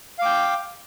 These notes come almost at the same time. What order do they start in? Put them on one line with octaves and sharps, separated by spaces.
F5 D6 G5